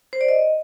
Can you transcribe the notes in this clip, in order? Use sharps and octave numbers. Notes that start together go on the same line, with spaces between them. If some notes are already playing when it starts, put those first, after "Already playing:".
C5
D5
D#5